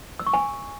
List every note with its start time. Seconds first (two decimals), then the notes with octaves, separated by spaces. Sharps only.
0.20 E6
0.27 C#6
0.33 G#5